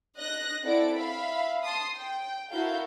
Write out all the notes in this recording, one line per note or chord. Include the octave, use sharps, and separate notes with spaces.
D#5 F#6 A#6
C4 E4 A4 D5 F#5 D7
E5 F5 B5
A5 C6 D#6
G5
E4 F#4 A4 A#4 F5 G6